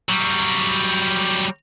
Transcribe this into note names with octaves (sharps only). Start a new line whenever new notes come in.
F#3 G3